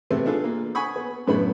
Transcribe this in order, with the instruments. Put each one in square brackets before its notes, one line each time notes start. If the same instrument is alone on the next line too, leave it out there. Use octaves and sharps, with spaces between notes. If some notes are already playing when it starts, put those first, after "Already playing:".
[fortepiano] C3 A3 B3 C4
D4 F4 G#4 A4 B4
A#3
F#5 G#5 B5 C#6 D#6
B3
F#2 A2 C#3 B3 D4 B5